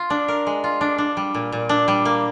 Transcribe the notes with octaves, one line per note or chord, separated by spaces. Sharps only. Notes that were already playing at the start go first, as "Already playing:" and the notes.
Already playing: F4
D4
A#4
G#3
F4
D4
D4
G3
A#2
A#2
D4
G3
A#3